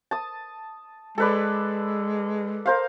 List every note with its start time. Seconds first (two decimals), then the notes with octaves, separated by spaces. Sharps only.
0.11 A5 D#6
1.18 G#3 A4 B4 D5
2.66 A#4 C5 F5